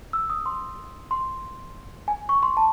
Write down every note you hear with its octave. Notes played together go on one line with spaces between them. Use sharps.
E6
D#6
C6
C6
G#5
C#6
C6
A5